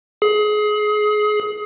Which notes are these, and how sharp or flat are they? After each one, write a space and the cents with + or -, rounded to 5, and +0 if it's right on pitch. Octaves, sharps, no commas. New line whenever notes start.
G#4 +25